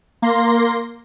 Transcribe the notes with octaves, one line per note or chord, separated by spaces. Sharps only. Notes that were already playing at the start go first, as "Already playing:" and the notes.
A#3 C6 A#6